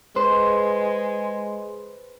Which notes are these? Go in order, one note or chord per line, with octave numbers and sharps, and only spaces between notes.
G#3 B4 C5